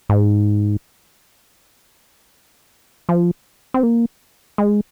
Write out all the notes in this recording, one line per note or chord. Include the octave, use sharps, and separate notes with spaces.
G#2
F3
C4
A#3
G#3